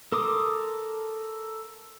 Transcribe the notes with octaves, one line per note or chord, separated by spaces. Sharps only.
A4 A#4 C6 D6 D#6